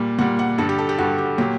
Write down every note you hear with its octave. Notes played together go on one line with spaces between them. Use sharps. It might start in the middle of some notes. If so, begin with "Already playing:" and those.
Already playing: A#2 G3
A#2 G3 F#5
F#5
G2 D3 G3 A4
G4
A4
G4
G2 D3 G3 F#4
G4
A#2 F#3 G4